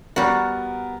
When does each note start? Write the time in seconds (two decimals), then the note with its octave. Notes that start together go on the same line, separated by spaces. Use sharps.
0.16 G3 B3 F#4 A#4